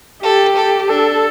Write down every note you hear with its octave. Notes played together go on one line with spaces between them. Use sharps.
G4 A4
A4
D4 A4